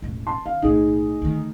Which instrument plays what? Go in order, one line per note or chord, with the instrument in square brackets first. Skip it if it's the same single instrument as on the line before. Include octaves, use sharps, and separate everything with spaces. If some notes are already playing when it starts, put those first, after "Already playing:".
[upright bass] E1 A1
[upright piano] A5 C6
[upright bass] D#3 [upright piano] F5
[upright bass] B1 A2 [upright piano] D#4 G#4
[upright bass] D2 D#3